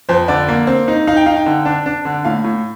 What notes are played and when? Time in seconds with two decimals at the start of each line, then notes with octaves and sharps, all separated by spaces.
0.09 F2 C5
0.28 D3 D5
0.48 A#3
0.67 C4
0.88 D#4
1.07 D#4 F5
1.17 G5
1.26 D#4 F5
1.36 G5
1.46 D3
1.65 D4
1.86 D4
2.05 D3
2.25 A2 F5
2.44 A2